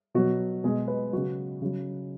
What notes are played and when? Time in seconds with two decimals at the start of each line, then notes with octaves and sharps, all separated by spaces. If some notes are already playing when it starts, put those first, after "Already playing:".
0.14 B2 F#3 F#4
0.64 B2 G#3 G#4
0.88 B4
1.13 C#3 F#3 F#4
1.62 C#3 F#3